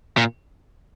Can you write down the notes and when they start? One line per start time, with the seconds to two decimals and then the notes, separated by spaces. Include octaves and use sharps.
0.17 A#2